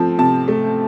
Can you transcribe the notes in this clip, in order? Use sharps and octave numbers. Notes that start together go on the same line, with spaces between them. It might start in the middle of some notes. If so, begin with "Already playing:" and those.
Already playing: F3 A3 C4 A5
C3 A5
A3